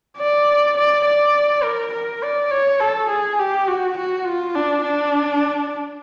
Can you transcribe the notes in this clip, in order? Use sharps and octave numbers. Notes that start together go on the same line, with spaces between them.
D5
D5
D5
A#4
A#4
D5
C#5
A4
G#4
G4
F#4
F#4
F4
D4
D4